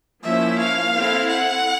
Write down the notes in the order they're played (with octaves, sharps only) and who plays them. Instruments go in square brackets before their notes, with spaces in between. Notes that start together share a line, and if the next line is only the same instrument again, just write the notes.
[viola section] F3 A#3 C#4 E4 [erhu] E5
[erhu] F5
[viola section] C4 E4 A4
[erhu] F#5